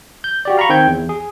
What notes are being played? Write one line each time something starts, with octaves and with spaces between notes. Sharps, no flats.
G6
F#4 G4 D5
F5 A#5 B5 C#6
D#3 C4 G5 G6 G#6
E2
G#4